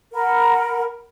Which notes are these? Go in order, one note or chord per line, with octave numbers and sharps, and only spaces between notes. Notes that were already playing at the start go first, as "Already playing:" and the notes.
A#4 F#5 B5